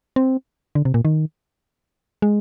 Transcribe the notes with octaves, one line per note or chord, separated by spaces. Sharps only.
C4
D3
C3
A#2
D#3
G#3